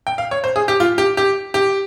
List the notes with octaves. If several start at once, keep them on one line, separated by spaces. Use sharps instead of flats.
G5
F5
C#5
C5
G#4
G4
F4
G4
G4
G4